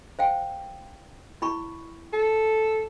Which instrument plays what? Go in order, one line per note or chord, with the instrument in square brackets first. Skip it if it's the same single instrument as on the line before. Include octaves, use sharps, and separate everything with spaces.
[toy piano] C5 F5 G5
E4 B5 C#6
[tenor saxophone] A4